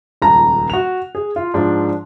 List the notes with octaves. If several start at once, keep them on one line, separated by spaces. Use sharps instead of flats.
D#1 C#2 A5 A#5
F#4 F7
G#4
F4
G#2 F3 D4